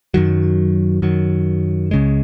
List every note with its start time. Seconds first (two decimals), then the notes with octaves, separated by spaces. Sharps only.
0.14 F#2 D#3 F#3
1.02 F#2 D#3 F#3
1.91 C#2 C#3 G#3